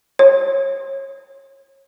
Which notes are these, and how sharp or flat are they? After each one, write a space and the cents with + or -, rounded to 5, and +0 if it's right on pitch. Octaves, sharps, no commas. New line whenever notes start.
C#5 -30